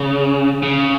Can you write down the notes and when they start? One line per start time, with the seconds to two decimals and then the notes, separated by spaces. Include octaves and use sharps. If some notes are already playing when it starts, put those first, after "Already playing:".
Already playing: C#3
0.63 C#3